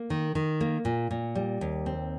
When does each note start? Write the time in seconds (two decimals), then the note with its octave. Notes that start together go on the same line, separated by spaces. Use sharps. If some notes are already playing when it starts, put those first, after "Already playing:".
Already playing: A#3
0.10 D#3
0.35 D#3
0.61 A#3
0.85 A#2
1.11 A#2
1.35 G3
1.61 D#2
1.86 C4